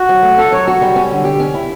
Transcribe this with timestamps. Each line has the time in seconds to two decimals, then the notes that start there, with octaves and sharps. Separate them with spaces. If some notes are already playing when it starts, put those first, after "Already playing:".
Already playing: F#4
0.09 F#3
0.23 A3
0.37 C#4 A4
0.52 F#3 C#5
0.67 F#4
0.82 G3
0.96 C#4
1.11 D3
1.25 G4
1.40 C#4
1.54 E4